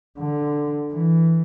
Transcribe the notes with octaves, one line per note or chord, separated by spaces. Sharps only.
D3
E3